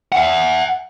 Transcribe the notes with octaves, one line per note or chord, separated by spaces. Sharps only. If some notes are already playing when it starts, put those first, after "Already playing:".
E5 F#5